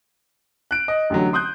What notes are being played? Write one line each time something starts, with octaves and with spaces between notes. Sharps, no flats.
F#6 D7
D#5
A1 D3 F#3
C6 D#6 F#6 G6